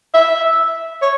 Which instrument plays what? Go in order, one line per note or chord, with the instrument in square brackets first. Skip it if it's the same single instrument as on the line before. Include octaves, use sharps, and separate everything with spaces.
[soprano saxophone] E5
C#5